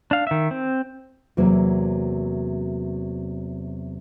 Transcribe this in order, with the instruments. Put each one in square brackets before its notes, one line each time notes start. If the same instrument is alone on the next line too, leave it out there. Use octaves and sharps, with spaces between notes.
[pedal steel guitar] D4 F5
D#3 E5
C4
[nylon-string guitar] E2 C3 F#3 A#3